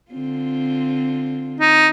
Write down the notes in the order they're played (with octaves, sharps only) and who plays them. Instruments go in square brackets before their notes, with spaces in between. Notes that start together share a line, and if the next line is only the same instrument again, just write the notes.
[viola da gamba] D3 C4 F4
[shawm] D#4